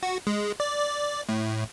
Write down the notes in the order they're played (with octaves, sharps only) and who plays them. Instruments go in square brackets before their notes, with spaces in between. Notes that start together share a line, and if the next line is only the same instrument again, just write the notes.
[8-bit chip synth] F#4
G#3
D5
D5
A2